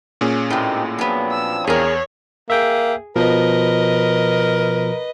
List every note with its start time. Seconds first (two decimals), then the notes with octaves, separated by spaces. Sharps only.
0.21 A#2 C#4 G#4
0.50 A2 G#3 C4 D#4 G4
0.99 F3 F#3 B3 C4 D4
1.32 E6
1.67 E2 G#4 A#4 C#5
2.50 A#3 G#4 E5 G5
3.16 B2 F3 A#4 B4 D#5